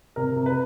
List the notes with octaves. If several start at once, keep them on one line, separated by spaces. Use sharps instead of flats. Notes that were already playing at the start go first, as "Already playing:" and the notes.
C3 A#4
C3
B4